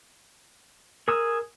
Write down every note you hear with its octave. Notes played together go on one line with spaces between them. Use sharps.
G#4 A#4 D#6 E6